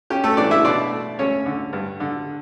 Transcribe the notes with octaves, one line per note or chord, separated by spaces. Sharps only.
C#4 G4
A3 A4
E3 D4 D5
E4 E5
B2 D4 D5
A3
D2 C#4 C#5
D3
G2
D3